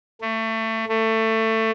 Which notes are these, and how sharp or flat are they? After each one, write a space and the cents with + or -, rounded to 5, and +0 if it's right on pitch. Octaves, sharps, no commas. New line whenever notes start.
A3 +25
A3 +20